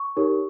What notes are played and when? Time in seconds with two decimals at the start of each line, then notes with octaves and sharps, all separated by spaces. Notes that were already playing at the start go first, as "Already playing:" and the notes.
Already playing: C#6
0.17 D#4 G4 A#4 C#5